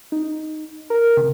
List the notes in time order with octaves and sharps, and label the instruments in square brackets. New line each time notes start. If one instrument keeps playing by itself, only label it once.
[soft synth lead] D#4
A#4
C#3